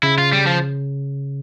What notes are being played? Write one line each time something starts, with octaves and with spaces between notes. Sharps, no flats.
C#3 E4
F4
G3
F3